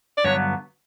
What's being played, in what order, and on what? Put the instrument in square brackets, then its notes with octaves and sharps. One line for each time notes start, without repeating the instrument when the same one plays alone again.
[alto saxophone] D5
[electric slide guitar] G2 D3 F#3 B3 [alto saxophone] C#5